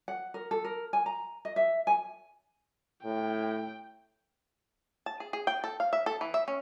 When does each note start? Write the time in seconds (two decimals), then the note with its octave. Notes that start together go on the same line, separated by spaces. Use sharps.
0.08 F#5
0.34 A#4
0.51 A4
0.64 A#4
0.93 G#5
1.06 A#5
1.45 D#5
1.56 E5
1.87 G#5
3.05 A2 G5
5.06 A5
5.20 G#4
5.33 G#4
5.47 G5
5.64 A4
5.80 F5
5.93 E5
6.06 A4
6.21 E3
6.34 E5
6.48 C#4